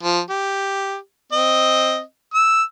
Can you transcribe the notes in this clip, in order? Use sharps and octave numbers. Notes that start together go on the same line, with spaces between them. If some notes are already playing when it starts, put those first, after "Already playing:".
F3
G4
C4 D#5
E6